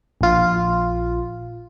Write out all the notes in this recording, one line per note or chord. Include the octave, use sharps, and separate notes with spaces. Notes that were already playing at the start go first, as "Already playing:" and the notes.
A#1 F4